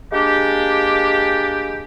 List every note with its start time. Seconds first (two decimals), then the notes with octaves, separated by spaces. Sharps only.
0.12 G#3 A#3 D4 G4